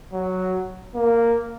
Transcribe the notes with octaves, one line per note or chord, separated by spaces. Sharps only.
F#3
A#3